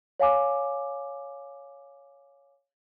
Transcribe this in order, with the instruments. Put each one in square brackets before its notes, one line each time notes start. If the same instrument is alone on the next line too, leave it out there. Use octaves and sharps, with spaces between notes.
[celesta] C#5 F5 G#5 D6